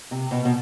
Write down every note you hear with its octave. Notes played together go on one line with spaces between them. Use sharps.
C3
B2
B2